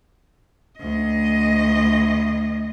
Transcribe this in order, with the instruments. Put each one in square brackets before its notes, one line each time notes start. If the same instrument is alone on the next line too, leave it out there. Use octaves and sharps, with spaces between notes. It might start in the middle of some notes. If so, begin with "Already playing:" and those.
[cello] D2 D#5